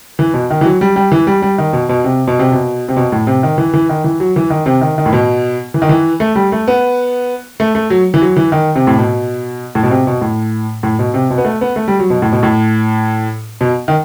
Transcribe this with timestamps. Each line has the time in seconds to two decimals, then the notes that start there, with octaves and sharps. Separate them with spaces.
0.19 E3
0.34 B2
0.50 D#3
0.61 E3
0.65 F#3
0.81 G3
0.96 G3
1.12 E3
1.27 G3
1.42 G3
1.58 D#3
1.73 B2
1.89 B2
2.04 C3
2.28 B2
2.39 C3
2.52 B2
2.88 C3
2.97 B2
3.12 A2
3.27 C3
3.43 D#3
3.58 E3
3.74 E3
3.89 D#3
4.04 E3
4.20 F#3
4.36 E3
4.50 D#3
4.66 C3
4.81 D#3
4.98 D#3
5.06 A2
5.13 B2
5.74 E3
5.82 D#3
5.89 E3
6.20 A3
6.35 G3
6.52 A3
6.68 B3
7.60 A3
7.75 A3
7.90 F#3
8.14 E3
8.22 F#3
8.36 E3
8.52 D#3
8.76 C3
8.87 A2
8.99 B2
9.75 A2
9.83 B2
9.90 C3
10.07 B2
10.21 A2
10.83 A2
10.99 B2
11.14 C3
11.30 B2
11.38 B3
11.45 A3
11.61 B3
11.76 A3
11.88 G3
11.99 F#3
12.10 B2
12.22 A2
12.32 B2
12.43 A2
13.61 B2
13.88 D#3